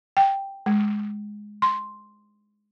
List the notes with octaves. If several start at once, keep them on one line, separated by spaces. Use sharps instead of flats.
G5
G#3
C6